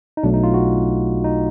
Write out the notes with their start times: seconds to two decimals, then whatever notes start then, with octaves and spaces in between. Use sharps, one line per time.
0.17 D#4
0.23 B1 B2 F#3 A3 D4
0.34 D#4
0.43 F4
0.54 F#4
1.24 D#4